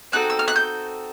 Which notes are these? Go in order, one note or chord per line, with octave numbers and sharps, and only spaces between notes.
C4 D#4 F#4 A4 F#6
E6
F6
F#6
G6